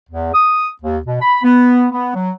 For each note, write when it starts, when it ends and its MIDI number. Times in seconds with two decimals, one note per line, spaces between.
0.09 0.32 40
0.34 0.67 87
0.82 0.97 39
1.06 1.19 47
1.21 1.42 83
1.43 1.87 59
1.91 2.11 59
2.14 2.31 54